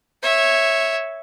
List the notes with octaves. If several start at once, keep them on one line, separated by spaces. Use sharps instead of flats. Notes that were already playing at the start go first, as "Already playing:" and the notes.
C#5 E5